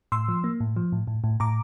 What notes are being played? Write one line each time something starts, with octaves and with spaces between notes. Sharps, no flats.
A2 C6 E6
F3
A#3
A2
F3
A2
A2
A2
A2 A#5 D6